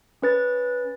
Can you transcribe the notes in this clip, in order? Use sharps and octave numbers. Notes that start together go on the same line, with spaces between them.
C#4 B4 A6